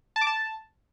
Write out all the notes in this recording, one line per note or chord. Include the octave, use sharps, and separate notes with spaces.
A5
D6
A5